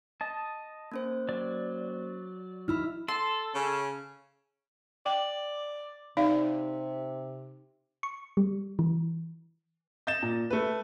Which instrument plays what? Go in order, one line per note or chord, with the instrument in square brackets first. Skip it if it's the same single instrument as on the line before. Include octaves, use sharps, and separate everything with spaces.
[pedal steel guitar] D#5 A5
[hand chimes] A#3 C#4 C5
[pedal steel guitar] F#3 D5
[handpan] D#4 E4 [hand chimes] B5 E6 F6
[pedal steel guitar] A4 [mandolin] C6
[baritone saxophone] C#3 [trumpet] C#4
[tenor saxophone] D5 [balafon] G5
[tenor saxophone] C3 [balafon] D#4 D5 F5
[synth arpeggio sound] C#6
G3
E3
[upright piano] D#5 G6 A6 E7
A#2
A3 B4